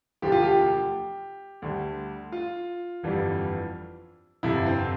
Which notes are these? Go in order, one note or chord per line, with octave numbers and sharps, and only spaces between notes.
E1 D2 D3 F3 G4
F4
G4
D2 D3 G3
F4
G1 F2 E3 G3
G1 F2 C3 E4
C4